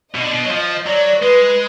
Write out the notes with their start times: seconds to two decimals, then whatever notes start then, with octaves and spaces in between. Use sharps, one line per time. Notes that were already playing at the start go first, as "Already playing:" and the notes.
0.14 B2 D#5
0.22 D3
0.31 B2
0.45 F#3
0.50 F3
0.86 F#3 D5
1.22 G#3 B4